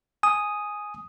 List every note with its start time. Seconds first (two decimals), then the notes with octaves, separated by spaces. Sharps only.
0.23 G#5 D#6